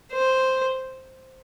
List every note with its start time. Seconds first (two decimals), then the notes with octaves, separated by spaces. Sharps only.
0.12 C5